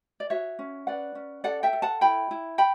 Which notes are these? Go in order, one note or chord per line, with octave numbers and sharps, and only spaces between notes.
D5
F#4 C#5 E5
C#4
B4 D5 F#5
C#4
A4 D5 F#5
E5 G5
A4
F#5 A5
E4 G5 B5
E4
G5 B5